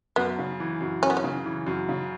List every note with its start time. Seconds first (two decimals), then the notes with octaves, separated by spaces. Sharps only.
0.16 F#2 B3
0.38 C#3
0.60 E3
0.81 F#2
1.02 F#2 C#4
1.10 B3
1.17 C#4
1.24 C#3
1.46 E3
1.66 F#2
1.89 C#3